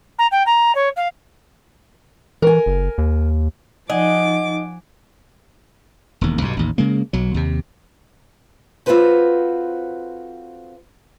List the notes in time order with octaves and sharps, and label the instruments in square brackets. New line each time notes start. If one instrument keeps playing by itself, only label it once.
[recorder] A#5
G5
A#5
C#5
F5
[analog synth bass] E3 [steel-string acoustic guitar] A#4 G#5
[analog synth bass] F#1
D#2
[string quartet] F3 D6 [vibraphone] D#4 [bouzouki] D#5 [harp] F#5 G#5
[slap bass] E1 D#2
B1 G2 B2
A1 D#2
C#3 G#3 A#3
B1 F#3
D#2 C3
[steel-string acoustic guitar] C4 F4 F#4 A4 B4 C5